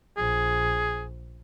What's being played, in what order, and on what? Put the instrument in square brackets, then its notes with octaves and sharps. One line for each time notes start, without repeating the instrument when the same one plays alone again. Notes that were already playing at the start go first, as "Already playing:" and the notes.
[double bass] A#1 [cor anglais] G#4